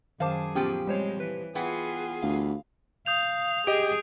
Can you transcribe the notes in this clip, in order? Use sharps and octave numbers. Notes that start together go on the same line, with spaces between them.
F#2 D#3 G#4 C5 F5 A5 D6
A#2 F3 B3 C#4 G4
G3 G#3 C4 C5 C#5
E3 B4
E3 B3 F4 G#4 G5
D2 F5
F5 D#6 G6 F7
G4 G#4 D#5 D7